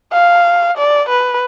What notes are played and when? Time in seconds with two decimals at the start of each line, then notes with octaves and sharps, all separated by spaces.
0.12 F5
0.77 D5
1.09 B4